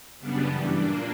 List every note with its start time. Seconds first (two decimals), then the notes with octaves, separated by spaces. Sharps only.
0.19 F#2 C#3 G3 B3 D4
0.48 G2 E3 G3
0.77 A#2 A#3 D4